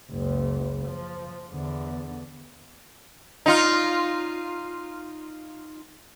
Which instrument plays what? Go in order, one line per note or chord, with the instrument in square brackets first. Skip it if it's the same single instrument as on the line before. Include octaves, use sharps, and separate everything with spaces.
[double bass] F#1 C#2
F3
E2 D3
[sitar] D#4 F4